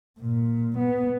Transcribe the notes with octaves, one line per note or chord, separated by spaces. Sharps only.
A#2
B3